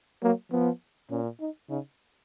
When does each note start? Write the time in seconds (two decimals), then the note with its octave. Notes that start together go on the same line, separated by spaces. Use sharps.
0.23 F#3 A#3
0.52 F3 B3
1.10 A#2 C#4
1.40 D#4
1.70 C#3 D#4